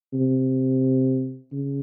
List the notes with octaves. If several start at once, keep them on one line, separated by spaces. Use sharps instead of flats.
C3
C#3